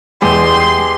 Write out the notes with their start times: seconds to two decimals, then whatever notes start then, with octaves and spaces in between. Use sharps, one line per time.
0.22 E2 G#3 G4 C6